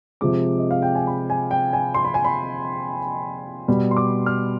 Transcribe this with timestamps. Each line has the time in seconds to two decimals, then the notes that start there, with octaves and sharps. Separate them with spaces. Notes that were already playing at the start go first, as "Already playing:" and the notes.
0.21 C3 F3 G#3 D6
0.58 D#5
0.71 F5
0.82 G5
0.95 G#5
1.07 B5
1.30 G#5
1.51 G5
1.73 G#5
1.94 C6
2.05 B5
2.14 G#5
2.25 B5
3.68 B2 G3 B5
3.91 C6
3.97 D6
4.26 F6